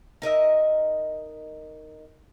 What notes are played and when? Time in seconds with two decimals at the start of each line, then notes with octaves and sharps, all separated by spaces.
0.22 D#4 A#4 D#5 E5